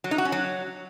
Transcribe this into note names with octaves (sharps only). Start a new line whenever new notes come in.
F#3
D#4
F#4
C#4
F#3